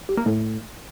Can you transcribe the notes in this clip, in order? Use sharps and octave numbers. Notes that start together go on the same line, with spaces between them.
G3
A#3
A2